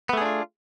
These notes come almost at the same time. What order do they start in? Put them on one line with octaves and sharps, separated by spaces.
B3 A3 G#4 D4 F4